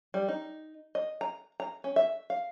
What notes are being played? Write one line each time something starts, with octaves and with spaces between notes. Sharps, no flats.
G3
D#4
D#5
A#5
A#5
C#4
E5
F5